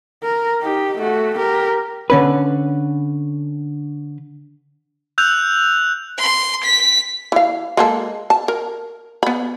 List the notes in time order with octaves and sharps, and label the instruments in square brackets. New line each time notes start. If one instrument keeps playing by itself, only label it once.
[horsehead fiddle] A#4
D#4 G4
A3 F#4
G4 A#4
[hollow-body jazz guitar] D3 C#4 B4
[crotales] E6 F#6 G6 F7
[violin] C6
B6
[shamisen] E3 F5
G#3 A#3 A4
A5
A#4
B3 B5